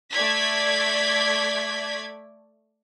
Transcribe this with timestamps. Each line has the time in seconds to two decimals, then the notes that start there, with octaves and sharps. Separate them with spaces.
0.11 A3 D5 G#6 B6